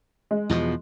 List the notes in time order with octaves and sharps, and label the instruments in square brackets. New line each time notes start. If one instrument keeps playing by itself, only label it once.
[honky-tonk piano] G#3
[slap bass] E2 B2 F3